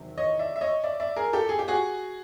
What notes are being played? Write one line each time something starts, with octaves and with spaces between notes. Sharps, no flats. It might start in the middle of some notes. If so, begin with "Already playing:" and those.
Already playing: E2 C3 D#3 F#3
C#5 D#5
D5 E5
E5
C#5 D#5
D5 E5
D5 E5
G#4 A#4
G4 A4
G#4
G4
F#4 G#4